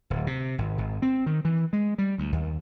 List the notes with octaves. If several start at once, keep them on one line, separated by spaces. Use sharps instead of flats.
D1
C3
G#1
G#1
C4
D#3
E3
G#3
G3
D2
D#2